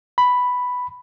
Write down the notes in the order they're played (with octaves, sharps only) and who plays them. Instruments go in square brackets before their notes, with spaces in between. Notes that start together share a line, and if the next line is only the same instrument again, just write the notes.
[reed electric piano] B5